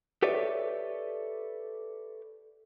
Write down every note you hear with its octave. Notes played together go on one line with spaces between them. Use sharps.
G4 A4 B4 C#5 D5 E5